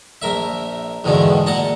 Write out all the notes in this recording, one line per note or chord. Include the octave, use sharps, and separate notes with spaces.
A#1 A#4 E5
E2 G#2 B2 D3 D#3
A#2 F#5 A5 A#5